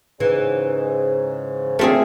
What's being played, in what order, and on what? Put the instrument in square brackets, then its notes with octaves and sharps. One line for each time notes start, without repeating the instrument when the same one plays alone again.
[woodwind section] G#2 C#3 [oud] E3
[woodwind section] D2 C#3 [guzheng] A3 C4 G#4 [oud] A#3 F4